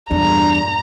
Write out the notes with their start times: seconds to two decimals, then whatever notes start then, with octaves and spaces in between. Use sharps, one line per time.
0.11 E2 G2 A#2 D4 A#5